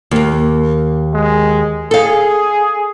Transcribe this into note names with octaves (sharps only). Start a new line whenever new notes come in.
D#2 A#3
G#3
G#4 A4 F5